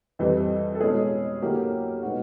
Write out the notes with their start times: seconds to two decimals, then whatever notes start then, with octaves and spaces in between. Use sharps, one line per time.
0.19 F2 C3 E3 G3
0.75 A4
0.81 B2 G#3 C#4 E4 G#4
1.42 D3 F#3 A#3 C#4 E4 G4
2.02 B2 G#3 B3 D#4 F#4